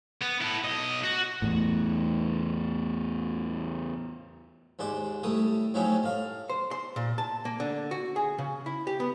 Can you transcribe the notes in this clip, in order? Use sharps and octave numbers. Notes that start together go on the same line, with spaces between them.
B3
E4 A4
B1 D#5
F#4
E2 A2
D#2 G#2 C5 D5
A2 G3 A3 D#6
A2 F3 F#3 C#4 D#4 G4
A2 F5
C5
C6
A#2
A5
A#3
D3
F#4
G#4
C#3
E4
G4
B3